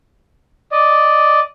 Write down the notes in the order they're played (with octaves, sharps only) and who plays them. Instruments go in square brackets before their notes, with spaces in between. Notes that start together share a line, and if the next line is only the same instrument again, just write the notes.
[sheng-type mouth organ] D5 D#5